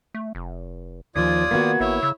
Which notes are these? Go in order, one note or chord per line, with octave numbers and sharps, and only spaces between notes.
A3
F1
D#2 D#3 F3 F4 D5 D#6 G#6
D#3 A#3 B3 F#4
G#1 E4 C#5 E5
C#3 E6